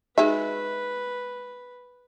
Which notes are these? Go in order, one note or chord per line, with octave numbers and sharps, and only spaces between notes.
G#3 D#4 F#4 B4 E5